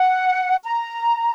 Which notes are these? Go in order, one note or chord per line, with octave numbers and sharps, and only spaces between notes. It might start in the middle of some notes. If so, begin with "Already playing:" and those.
Already playing: F#5
A#5